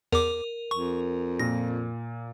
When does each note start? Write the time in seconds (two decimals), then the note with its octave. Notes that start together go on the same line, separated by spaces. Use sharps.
0.12 E2 A#4 D6
0.71 F2 C#6
1.39 A#2 A#6